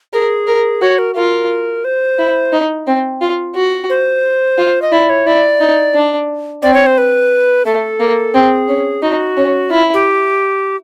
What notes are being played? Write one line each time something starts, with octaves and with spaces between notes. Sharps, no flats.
G#4 A#4
A#4
F#4 C#5
A#4
F4 A#4
C5
E4
D#4
C4
F4
F#4
C5
F4
D#5
E4 D5
C#5
E4 D5
D#4
D4
C4 D5
C#5
C5
B4
A3 A4
A#3
C4 G#4
C#4
D#4 F#4
C#4
E4 F4
G4